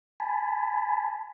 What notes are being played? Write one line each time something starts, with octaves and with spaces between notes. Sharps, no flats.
G#5 A5 B5